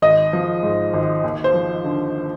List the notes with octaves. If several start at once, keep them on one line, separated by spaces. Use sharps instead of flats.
G#1 D#5
F3
G#2
G#1
D#2
C5
F3
D3